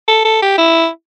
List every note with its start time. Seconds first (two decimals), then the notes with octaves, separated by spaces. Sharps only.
0.08 A4
0.25 A4
0.42 G4
0.58 E4